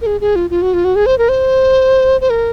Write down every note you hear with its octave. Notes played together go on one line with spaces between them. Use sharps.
A#4
G#4
G#4
F4
F4
F#4
F4
F#4
G#4
C5
A#4
C5
C5
A#4